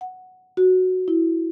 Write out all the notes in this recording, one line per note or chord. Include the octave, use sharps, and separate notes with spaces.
F#5
F#4
E4